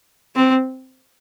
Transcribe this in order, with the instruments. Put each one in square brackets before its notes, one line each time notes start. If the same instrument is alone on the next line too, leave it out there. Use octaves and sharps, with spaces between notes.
[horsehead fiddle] C4